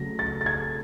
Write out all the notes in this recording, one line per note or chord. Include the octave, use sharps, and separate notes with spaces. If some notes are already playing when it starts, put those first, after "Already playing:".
Already playing: C#3 F#3 A3 A#6
A6
A6
G#6